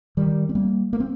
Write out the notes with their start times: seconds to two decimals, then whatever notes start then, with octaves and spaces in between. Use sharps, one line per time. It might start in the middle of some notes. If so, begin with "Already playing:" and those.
0.17 D#3 G3
0.49 C4
0.55 G3 A#3
0.93 A#3
1.00 C4